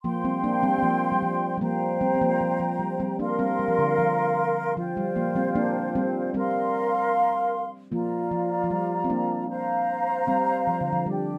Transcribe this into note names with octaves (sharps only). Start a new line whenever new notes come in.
F3 A#3 C5 G5 C6
G3 C4
A#3 D4
G3 C4
C4
F3 A#3
G3
F3
G3
F3 A#3 C5 G5 A#5
G3 C4
C4
F3 A#3
F3
F3
G3
G3 C4
A#3 D4 A#4 F5 C6
G3 C4
G3
F3
D3
F3
F3 F4 C5 G5
G3
F3 A#3
G3 C4
A#3 D4
G3 C4
G3 C4 A#4 F5 C6
F3 A#3 F4 D5 A#5
F3
F3
G3
C4
A#3 D4
C5 F5 A#5
G3 C4
F3
D3
F3
G3 D4 G4 D5 G5